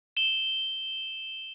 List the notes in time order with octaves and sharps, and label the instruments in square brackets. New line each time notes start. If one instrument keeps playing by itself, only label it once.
[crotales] E7 G7